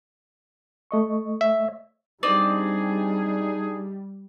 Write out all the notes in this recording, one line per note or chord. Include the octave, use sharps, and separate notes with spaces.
A3 D#5 C#6
E5
G3 C4 D4 D#4 G#4 D5 D#6